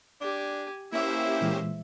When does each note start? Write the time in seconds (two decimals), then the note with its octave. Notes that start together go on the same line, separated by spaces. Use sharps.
0.21 D4 G4 G#5
0.92 A#3 C#4 E4 G4 C5 E5
1.41 A#2 E3 G#3